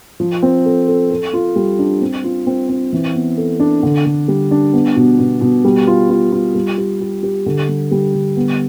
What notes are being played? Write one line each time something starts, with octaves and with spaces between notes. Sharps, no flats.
F3
C4
A4
A4
A4
F4
G3
D4
C4
F4
C4
C4
E3
B3
A4
D4
D3
D3
G3
D4
B3
B2
B2
B2
G3
F4
F4
F4
G3
G4
G4
G4
D3
G3
G3
D3
B3